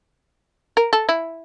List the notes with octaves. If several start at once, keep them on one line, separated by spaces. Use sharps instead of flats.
A#4
A4
E4